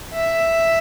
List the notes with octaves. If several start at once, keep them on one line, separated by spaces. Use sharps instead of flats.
E5